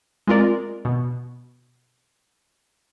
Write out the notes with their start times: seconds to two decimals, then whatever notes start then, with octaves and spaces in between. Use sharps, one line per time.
0.27 G#3 C4 F4 A#4 D5
0.85 B2